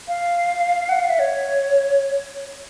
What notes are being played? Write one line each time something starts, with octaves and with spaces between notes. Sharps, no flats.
F5
F#5
F5
E5
C#5